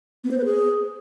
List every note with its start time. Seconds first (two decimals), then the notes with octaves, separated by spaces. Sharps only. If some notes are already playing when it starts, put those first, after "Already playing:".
0.24 B3
0.31 C5
0.38 B4
0.45 G#4